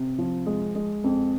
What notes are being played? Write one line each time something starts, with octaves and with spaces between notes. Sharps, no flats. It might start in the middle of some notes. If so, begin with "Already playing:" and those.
Already playing: C3
F3
G#3
G#3
F2